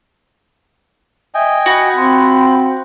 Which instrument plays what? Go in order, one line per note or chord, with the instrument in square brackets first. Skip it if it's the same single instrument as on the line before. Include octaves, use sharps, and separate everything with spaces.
[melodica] D#5 G5 G#5 [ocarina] E5
[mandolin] F#4 [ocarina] B5
[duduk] C4 [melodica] F4